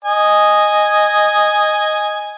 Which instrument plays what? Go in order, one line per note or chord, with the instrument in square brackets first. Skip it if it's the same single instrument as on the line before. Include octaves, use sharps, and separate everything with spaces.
[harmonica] D#5 G#5